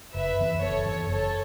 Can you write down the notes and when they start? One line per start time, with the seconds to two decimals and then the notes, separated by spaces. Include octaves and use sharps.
0.14 F#1 B4 E5
0.38 F#2 E3 B3
0.61 F#1 A4 C#5
0.86 F#2 E3 B3
1.09 F#1 A4 C#5